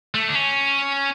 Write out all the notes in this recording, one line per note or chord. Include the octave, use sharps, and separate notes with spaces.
A3
D4
C#4